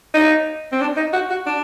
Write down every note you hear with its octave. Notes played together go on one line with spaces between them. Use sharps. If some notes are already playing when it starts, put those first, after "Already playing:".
D#4
C4
D4
D#4
F#4
F#4
D4